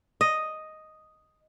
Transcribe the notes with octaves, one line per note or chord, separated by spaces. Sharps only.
D#5